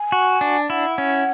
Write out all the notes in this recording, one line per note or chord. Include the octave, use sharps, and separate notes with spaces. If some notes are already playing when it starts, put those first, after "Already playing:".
Already playing: G#5
F#4
D4
E4 F#5
C#4